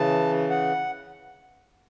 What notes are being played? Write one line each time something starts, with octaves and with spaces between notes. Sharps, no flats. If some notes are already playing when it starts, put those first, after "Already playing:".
Already playing: C#3 E3 A5
F#5